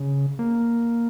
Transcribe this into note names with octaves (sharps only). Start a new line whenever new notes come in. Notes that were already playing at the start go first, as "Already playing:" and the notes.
Already playing: C#3
A#3